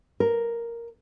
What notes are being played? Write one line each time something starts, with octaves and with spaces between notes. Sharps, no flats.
A#4